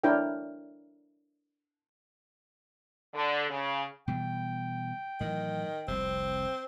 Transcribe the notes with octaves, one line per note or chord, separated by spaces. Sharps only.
D4 E4 A#4 C#5 G5
D3
C#3
B2 E3 G3 G5
A2 D#3 E3 F#3
F1 C2 F2 C4